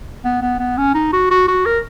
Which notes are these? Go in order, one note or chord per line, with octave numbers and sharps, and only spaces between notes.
B3
B3
B3
C#4
D#4
F#4
F#4
F#4
A#4